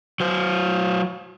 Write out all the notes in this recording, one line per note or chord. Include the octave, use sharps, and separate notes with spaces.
F#3 C5